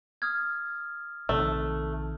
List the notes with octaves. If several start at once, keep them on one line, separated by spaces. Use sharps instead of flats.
D#6 F6 G#6
A#1 C3 D#3 A3